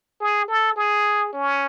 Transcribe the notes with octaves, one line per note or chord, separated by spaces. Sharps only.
G#4
A4
G#4
C#4